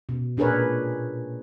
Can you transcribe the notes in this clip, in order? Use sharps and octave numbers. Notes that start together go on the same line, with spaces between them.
B2
A#2 D4 G#4 A#4 B4 C#5